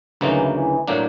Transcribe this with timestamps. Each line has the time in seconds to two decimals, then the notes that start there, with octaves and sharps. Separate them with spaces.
0.21 D2 C#3 E3 F#3 A#3 D#4
0.55 E3
0.87 A2 F#3 A#3 D4